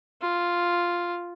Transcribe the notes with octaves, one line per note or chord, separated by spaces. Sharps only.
F4